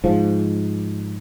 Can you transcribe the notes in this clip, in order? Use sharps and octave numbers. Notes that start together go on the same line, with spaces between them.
G#2 F3